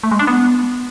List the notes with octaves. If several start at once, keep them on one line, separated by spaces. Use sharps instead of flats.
A3
G#3
D4
B3